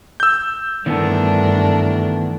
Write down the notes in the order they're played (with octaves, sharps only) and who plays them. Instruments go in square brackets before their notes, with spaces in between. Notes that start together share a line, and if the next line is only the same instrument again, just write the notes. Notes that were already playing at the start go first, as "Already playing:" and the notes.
[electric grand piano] E6 G6
[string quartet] G2 D4 A#4 [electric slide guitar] D#3 E3 B3 [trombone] A3